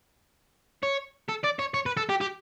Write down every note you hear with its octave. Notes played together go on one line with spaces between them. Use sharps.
C#5
A4
D5
C#5
C#5
B4
A4
G4
G4